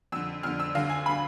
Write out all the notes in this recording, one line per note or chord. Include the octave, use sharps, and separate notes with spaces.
F2 D3 E6
F2 D3 F6
E6
D2 D3 F5
G#5
D3 B5